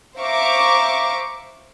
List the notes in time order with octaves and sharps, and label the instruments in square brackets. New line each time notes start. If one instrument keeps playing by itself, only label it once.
[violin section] C5 E5 F5 A#5 C#6 D6